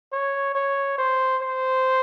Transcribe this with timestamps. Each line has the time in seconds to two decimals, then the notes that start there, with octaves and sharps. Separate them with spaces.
0.12 C#5
0.55 C#5
0.98 C5
1.42 C5